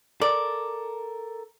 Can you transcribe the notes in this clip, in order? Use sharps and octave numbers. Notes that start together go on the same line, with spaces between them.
A4 A#4 D5